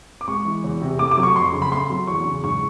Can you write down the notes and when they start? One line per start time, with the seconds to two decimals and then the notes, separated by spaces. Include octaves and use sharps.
0.21 D6
0.28 G#3 C#6
0.45 E3
0.64 E2
0.81 C3
0.99 A3 D6
1.11 D6
1.17 F#3
1.23 C#6
1.36 F2 C6
1.53 C#3
1.62 B5
1.72 A3 C6
1.90 F#3
2.07 E2 C#6
2.25 C#3
2.43 G#2 C#6